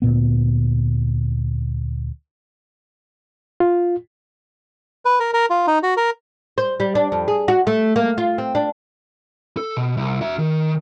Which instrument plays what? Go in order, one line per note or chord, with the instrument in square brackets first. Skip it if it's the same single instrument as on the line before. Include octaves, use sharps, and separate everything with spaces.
[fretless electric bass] D2 A#2 B3
[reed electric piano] F4
[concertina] B4
A#4
A#4
F4
D#4
F#4
A#4
[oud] C5
G3
D4
F2
G#4
F#4
A3
A#3
F4
C4
D4
[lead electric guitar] A4
B2
C2
F#4 E5
D#3